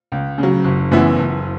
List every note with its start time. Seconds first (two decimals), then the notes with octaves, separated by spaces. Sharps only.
0.12 C#2
0.38 C#3
0.43 F#3
0.65 F#1
0.91 F#2 E3 B3 E4
1.18 F#1